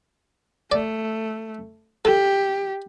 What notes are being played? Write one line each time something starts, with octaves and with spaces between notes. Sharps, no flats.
A3 D5
G4 A4